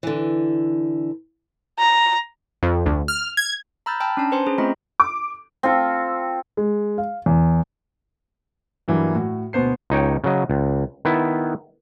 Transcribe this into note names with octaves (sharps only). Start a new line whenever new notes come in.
D3 E3
A#5
F2
D2
F6
G#6
A#5 B5 E6 F6 G6 A6
G5 A5 B5 E6 F6
C#4 D4 A5 A#5
B4 C5 G#5 C6
C#4 G#4
A3 C4 F4 D#5 A#5 B5
D6
C4 F4 A4
G#3
F5
E2
G2 E3 F#3 A#3
A2 F#4
D2 B2 B3 C5 C7
C#2 D#4 C#5 G5
C#3 F#3 D#5
C#2
D#3 B3 E4